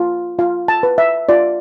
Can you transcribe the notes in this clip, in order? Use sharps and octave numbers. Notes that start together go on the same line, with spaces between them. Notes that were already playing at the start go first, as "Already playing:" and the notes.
Already playing: F4
F4 F5
A5
B4
E5
F4 D5